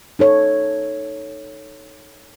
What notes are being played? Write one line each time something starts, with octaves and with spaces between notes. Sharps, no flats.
D#4 A4 C#5